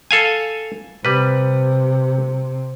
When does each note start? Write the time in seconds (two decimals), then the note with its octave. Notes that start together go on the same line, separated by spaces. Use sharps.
0.11 A4 F5 G#5
1.05 C3 G3 B4